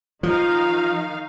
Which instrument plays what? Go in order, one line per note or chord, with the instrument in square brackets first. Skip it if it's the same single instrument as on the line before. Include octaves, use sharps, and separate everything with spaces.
[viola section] D#3 D#4 F5 [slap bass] F3